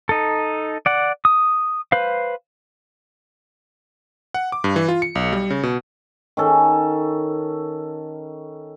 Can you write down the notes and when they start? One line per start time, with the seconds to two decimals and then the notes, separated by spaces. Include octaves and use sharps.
0.09 D#4 A4
0.86 D5 F#5
1.25 D#6
1.92 B4 C5 F5
4.34 F#5
4.52 D6
4.64 G2
4.76 E3
4.88 F4
5.02 C#7
5.15 B1
5.33 G3
5.50 C#3
5.63 B2
6.37 D#3 C#4 A4